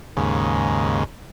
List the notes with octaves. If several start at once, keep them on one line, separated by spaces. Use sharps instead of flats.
D#2 G#2 C#3